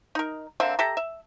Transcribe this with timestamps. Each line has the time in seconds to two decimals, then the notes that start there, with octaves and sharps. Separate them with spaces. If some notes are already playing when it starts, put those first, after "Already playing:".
0.15 D#4 A#4
0.60 D3 A#3 C4 E5
0.79 G4 A4 E5 A#5
0.97 E5